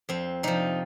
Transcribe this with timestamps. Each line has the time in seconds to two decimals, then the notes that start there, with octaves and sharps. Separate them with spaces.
0.09 F2 C4
0.43 C3 F3 D#4